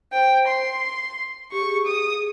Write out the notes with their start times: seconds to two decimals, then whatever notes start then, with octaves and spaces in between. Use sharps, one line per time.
0.12 C5 G5
0.47 C6
1.52 G4 C#6
1.62 G#4
1.71 G4
1.87 G#4 D#6
2.17 G#4